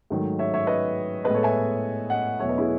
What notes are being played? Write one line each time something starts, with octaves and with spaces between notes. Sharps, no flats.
G#2 D#3 F#3 A3
C#5 E5
C#5 E5
B4 D#5
A2 G#3 B3 B4 D#5
A4 C#5
E5 G#5
D#5 F#5
E2 B2 F#3 A3 C#5 E5
B4 D#5
E4 G#4